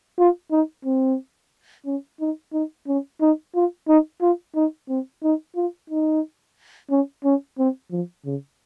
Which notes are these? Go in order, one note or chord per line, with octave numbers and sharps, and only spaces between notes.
F4
D#4
C4
C#4
D#4
D#4
C#4
D#4
F4
D#4
F4
D#4
C4
D#4
F4
D#4
C#4
C#4
C4
F3
C#3